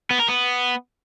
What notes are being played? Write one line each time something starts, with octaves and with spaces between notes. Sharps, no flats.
B3
A#4
B3